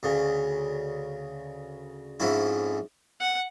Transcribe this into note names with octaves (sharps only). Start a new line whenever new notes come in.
D2 C#3
F2 G#2 C#4 E4
F#5